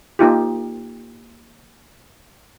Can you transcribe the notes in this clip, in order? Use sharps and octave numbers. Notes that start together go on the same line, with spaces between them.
A#3 D#4 F4 G4